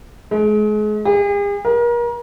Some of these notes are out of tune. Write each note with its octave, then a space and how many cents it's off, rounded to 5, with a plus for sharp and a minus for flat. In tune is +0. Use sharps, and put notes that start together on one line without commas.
G#3 +35
G#4 -45
A#4 +35